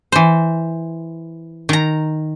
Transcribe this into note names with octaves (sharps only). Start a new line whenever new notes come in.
E3 C5
D#3 A#5